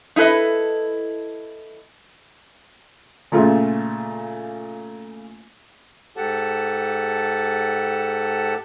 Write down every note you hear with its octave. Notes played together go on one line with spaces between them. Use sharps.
D#4 E4 A4 B4 D#5
A#2 C#3 A3 F4
G#2 G4 A4 F#5 A5